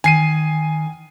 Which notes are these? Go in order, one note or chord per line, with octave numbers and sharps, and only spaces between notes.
D#3 G#5 C7 D#7